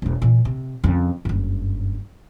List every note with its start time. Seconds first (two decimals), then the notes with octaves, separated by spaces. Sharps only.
0.02 E1 B3
0.22 A#2 E3
0.45 C3
0.84 F2 C#3
1.25 F#1 G2